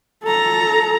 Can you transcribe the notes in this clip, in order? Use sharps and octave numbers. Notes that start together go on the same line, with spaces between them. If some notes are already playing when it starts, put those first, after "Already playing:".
A4 A#5